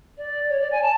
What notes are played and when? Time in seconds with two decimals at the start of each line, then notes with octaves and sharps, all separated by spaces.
0.18 D5
0.49 C#5
0.60 D5
0.72 G#5
0.82 A5